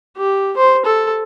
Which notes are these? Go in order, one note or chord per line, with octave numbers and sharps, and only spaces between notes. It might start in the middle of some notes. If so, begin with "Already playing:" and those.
G4
C5
A4